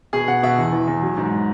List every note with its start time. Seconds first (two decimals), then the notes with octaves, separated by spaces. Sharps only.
0.13 B2 G#4
0.28 B2 F#5
0.43 B2 E5
0.58 E2
0.72 E3
0.87 E2
1.02 F#3
1.17 G#2